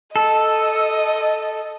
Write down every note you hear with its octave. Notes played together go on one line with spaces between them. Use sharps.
A4 D#5